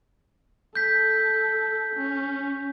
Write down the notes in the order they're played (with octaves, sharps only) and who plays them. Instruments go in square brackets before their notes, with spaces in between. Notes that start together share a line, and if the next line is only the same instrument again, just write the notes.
[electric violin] A4 [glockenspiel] G6 B6
[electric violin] C#4